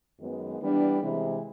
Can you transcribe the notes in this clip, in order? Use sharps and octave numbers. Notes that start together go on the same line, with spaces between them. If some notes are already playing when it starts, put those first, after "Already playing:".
F#2 D#3 G#3 B3
E3 G3 B3 D4
C3 E3 G#3